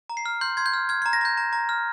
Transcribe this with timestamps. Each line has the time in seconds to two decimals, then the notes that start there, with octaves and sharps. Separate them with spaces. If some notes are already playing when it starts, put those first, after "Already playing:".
0.10 A#5
0.17 C7
0.26 F6
0.41 C6 G6
0.57 C6 G#6
0.66 G6
0.73 F6
0.89 F6 G#6
1.02 A#5 G#6
1.13 A#6
1.21 A#5 G6
1.37 A#5
1.53 A#5
1.69 F6